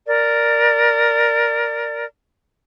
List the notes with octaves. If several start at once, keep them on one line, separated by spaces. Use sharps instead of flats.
A#4 D5